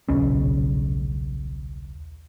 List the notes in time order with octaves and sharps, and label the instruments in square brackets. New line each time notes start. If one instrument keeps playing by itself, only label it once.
[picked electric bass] D#1 B1 C#3 C#4